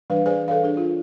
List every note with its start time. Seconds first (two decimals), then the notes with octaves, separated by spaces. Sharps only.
0.10 E3 G3 D4 B4 F5
0.26 G#4 B4 C5 D5 F5 G#5
0.48 A4 B4 C#5 F5
0.63 D4 G#4
0.77 F4